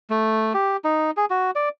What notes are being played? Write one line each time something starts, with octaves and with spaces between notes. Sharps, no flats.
A3
G4
D#4
G#4
F#4
D5